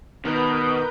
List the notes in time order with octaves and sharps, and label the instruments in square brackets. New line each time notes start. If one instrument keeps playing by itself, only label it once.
[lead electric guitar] B2 [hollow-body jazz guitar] D#3 [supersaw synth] A#4 B4 G6